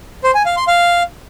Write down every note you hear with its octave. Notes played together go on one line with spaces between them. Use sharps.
C5
G#5
F5
C6
F5